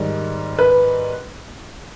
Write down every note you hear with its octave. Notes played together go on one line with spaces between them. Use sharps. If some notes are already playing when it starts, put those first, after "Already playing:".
Already playing: G#2 D#3 G3
B4